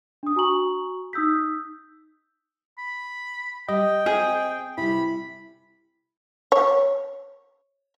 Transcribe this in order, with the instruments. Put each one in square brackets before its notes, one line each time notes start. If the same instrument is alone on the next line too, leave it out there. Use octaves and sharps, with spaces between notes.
[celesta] D4 D#6
F#4 G#5 A#5 C#6 F#7
D#4 D#6 E6 G6 B6
[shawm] B5
[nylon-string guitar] G3 [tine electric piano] D#5 [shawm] G5
[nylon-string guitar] C4 [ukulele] G#4
[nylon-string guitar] C3 G3 [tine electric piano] E4 [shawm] B5
[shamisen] C#5